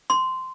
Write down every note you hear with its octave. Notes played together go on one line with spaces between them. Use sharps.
C6